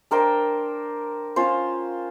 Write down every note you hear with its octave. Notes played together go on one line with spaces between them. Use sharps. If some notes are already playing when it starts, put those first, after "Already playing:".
D4 A#4 C5 G5
C#4 F4 C5